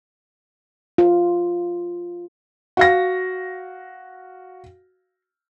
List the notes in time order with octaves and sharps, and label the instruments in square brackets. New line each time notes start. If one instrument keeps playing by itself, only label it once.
[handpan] F4
[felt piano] F#4 F5 A#6